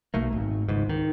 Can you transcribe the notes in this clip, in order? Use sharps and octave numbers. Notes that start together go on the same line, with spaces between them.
B1 A3 A#3
G#1
C#2 G#2
D#3